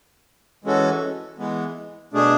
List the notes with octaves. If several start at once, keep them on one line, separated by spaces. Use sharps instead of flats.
E3 G#3 C#4 F#4 A4
E3 G#3 B3
B2 A3 D4 G#4